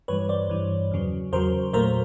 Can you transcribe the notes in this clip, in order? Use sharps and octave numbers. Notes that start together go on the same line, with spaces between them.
G2 E3 G3 B4 C#5
C5 D5
G2 E3 G3
E2 C#3 F#3
E2 C#3 F#3 A#4 C5
A#2 F#3 A3 A#4 C5